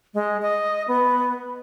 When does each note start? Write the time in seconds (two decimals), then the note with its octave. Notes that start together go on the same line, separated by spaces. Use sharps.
0.14 G#3
0.42 D#5
0.88 B3